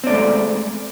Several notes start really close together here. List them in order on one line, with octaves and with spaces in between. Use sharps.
C4 D5 A3 G#3